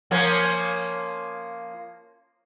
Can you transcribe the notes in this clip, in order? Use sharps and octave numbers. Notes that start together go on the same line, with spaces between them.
F3 A#3 C#4